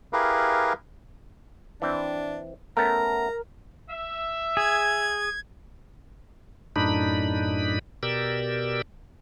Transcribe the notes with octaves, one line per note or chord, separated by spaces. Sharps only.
E4 G4 G#4 A#4 B4 F5
E3 C4 D4
A3 B3 C#4 A#4 A#5
E5
G#4 G#6
F#2 A2 D4 D#4 B5
B2 G4 A#4 D5 E6